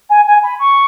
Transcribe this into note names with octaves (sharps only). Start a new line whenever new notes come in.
G#5
G#5
B5
C#6